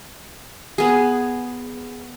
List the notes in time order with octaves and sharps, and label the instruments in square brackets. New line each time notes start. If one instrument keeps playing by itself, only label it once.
[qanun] B3 G#4